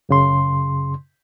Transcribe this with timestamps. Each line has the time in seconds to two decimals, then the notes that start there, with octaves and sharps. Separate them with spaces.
0.09 F#2 C#3 C6